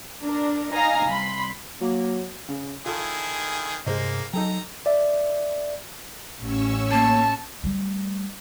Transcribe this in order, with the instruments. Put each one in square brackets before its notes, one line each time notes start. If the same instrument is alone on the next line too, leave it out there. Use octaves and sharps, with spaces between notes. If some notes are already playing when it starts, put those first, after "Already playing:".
[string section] D4 A#4
D#4 D#5 F5 G#5 A#5
C2 B5 C6
[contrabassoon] F#3 [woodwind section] A#3
[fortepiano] C#3
[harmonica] D#3 E4 G#4 [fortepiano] F4 A4
[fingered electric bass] G2 C3 [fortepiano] G#3 C5 D#5 [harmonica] A#3
[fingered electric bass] F#3 [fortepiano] D#4 A4 G5 [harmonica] A#5
[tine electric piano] D5 E5
[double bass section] A1 [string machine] C#4 C#6 E6
[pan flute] A#3 [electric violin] A5
[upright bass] G3 A3